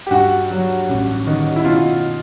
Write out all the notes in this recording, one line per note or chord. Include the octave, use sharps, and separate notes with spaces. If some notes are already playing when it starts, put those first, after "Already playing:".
G4
G2 F#4
F#3
A1
D#3
E4
B2 F4